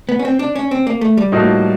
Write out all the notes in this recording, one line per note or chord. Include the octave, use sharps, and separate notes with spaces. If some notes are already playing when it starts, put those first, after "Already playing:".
B3
C#4
C4
D4
C#4
C4
A#3
A3
G3
A2 F3 A#3 D#4 F#4